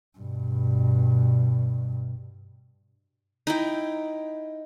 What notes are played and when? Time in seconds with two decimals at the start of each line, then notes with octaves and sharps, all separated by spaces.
0.18 G2 B2
3.47 D#4 E4 G5